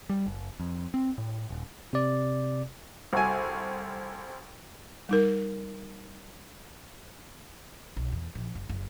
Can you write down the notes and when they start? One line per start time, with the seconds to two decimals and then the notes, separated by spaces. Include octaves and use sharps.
0.10 G3
0.26 F#1
0.60 F2
0.94 C4
1.18 A2
1.50 D#1
1.93 C3 D5
3.13 C2 F#4 A4 G#5
5.09 G3 D#4 A#4
7.97 B1
8.12 E2
8.35 A#1
8.55 F#1
8.69 F#1